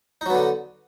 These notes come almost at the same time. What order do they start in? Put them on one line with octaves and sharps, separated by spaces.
D#4 F#3 B3 D3